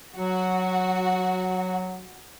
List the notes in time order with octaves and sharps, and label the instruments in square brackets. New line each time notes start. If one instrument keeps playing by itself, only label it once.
[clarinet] F#3 [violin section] F#4